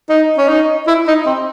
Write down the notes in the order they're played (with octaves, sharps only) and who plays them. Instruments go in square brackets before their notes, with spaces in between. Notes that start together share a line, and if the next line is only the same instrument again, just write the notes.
[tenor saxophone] D#4
C#4
D#4
E4
D#4
C4